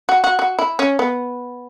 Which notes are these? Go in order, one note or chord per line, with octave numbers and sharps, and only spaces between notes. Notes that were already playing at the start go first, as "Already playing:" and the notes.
F#4
F#4
F#4
E4
C#4
B3